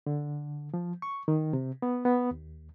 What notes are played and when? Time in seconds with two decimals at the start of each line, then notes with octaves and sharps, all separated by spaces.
0.06 D3
0.74 F3
1.02 C#6
1.28 D#3
1.53 C3
1.82 B3
2.05 B3
2.31 D#2